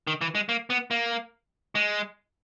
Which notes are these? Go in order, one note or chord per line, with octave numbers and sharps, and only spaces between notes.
D#3
E3
G#3
A#3
B3
A#3
G#3